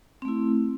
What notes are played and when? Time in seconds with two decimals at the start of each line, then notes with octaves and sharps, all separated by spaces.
0.22 C4
0.25 A3
0.28 E4